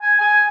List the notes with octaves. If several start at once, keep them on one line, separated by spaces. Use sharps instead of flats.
G#5
G#5